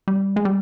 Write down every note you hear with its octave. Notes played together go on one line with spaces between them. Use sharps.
G3
G#3
G3